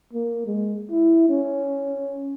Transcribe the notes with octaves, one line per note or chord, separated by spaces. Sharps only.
A#3
G#3
E4
C#4